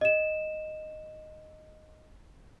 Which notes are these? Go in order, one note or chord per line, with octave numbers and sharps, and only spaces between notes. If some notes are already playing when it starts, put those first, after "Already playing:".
D#5 E7